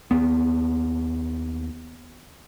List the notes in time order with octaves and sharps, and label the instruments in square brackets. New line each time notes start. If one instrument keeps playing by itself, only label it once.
[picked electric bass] D#2 B3